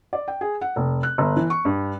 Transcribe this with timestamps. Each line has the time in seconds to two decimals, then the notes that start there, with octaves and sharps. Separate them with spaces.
0.13 D5
0.28 G5
0.41 G#4
0.61 F#5
0.76 F1
1.03 F#6
1.18 G1
1.36 E3
1.50 C#6
1.65 G2